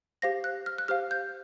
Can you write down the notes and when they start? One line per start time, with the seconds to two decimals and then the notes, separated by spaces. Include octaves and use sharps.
0.22 G4 C5 F5 A#6
0.44 F#6
0.66 F6
0.78 F#6
0.88 G4 C5 F5 F6
1.11 G6